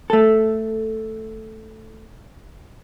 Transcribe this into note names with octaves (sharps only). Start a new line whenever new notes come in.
A3 A4